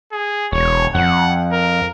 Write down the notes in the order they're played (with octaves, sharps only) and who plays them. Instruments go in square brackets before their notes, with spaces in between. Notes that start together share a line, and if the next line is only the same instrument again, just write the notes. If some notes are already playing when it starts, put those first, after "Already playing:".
[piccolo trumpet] G#4
[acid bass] E1 [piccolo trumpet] C#5
[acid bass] F2 [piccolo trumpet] F#5
[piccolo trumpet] A#4